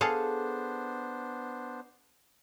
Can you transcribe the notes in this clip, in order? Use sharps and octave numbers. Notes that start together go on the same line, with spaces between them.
B3 D4 G#4 A4 C5 F5